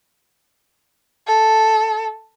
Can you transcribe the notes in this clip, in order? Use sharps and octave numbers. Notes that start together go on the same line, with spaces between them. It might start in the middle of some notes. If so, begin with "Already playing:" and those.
A4